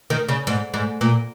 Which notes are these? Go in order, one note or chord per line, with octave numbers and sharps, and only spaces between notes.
D#3
C#3
G#2
G#2
A#2